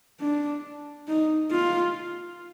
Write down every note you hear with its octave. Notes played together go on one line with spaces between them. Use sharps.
D4
D#4
F4